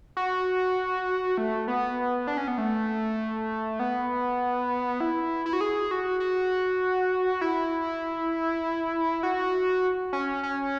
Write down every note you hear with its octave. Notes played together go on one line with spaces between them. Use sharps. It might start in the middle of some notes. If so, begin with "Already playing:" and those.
F#4
A3
B3
D4
C#4
B3
A3
B3
E4
E4
F#4
G#4
F#4
F#4
E4
F#4
C#4
C#4